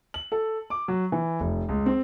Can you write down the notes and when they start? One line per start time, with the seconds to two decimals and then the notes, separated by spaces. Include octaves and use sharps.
0.14 F#7
0.32 A4
0.70 D6
0.88 F#3
1.12 E3
1.40 F1
1.69 C#2
1.86 C4